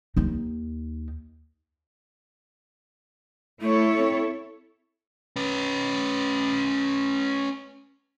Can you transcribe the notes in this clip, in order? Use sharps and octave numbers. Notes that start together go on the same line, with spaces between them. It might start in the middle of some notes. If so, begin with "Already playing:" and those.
D#2 D#4
A3 E4 A4 C#5
C4
C#4 B4